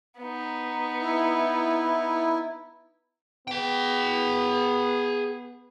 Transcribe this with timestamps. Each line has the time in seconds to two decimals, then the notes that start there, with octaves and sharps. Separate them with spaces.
0.20 B3 D#4
1.01 E4
3.48 B3 G#4 G5